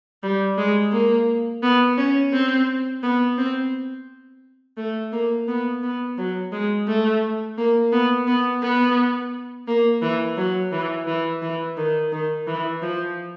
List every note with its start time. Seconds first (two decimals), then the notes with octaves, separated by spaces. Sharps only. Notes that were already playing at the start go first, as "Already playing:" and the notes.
0.23 G3
0.58 G#3
0.92 A#3
1.63 B3
1.98 C#4
2.33 C4
3.03 B3
3.38 C4
4.77 A3
5.13 A#3
5.48 B3
5.83 B3
6.18 F#3
6.52 G#3
6.88 A3
7.57 A#3
7.92 B3
8.27 B3
8.62 B3
9.67 A#3
10.02 E3
10.37 F#3
10.72 E3
11.07 E3
11.42 E3
11.77 D#3
12.12 D#3
12.47 E3
12.82 F3